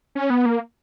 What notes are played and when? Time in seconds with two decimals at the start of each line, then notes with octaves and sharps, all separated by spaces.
0.15 C#4
0.30 B3
0.46 A#3